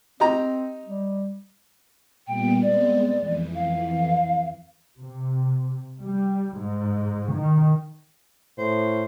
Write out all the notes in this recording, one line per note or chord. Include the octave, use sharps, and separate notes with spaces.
C4 D#4 G4 A#5
G3
A#2 G3 B3 G5
G#3 B3 C4 D5
F2 E3
F5
C3
G3
G#2
D#3
A2 C5